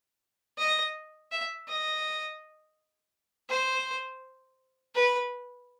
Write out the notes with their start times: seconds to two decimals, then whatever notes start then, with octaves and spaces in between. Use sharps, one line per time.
0.58 D#5
1.32 E5
1.68 D#5
3.50 C5
4.95 B4